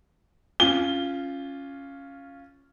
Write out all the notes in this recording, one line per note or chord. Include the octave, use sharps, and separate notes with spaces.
C#4 F4 G7